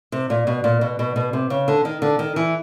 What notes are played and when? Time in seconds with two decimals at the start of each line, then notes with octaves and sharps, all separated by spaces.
0.12 C3
0.30 A#2
0.47 B2
0.64 A#2
0.81 B2
0.99 B2
1.16 B2
1.33 C3
1.50 C#3
1.68 D3
1.85 D#3
2.02 D3
2.19 D#3
2.36 E3